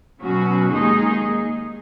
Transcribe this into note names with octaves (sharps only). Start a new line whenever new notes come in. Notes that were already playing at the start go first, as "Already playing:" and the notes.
B2 F#3 C#4 F#4
D#2 D#3 G#3 D#4 G#4